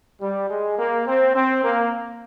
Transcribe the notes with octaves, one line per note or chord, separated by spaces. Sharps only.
G3
G#3
A#3
C4
C4
A#3